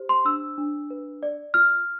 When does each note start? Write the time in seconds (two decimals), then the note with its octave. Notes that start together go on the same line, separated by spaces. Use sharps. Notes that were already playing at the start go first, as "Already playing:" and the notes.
Already playing: G4 C5
0.09 C6
0.25 D4 E6
0.58 D4
0.90 B4
1.23 D5
1.54 F4 F6